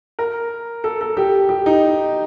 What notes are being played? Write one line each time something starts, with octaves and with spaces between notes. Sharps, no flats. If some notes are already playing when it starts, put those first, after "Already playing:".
A#4
A4
A4
G4
G4
D#4